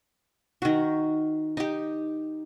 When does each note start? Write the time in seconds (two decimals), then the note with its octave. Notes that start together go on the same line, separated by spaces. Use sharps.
0.62 D#3 F#4
1.57 D#4 G4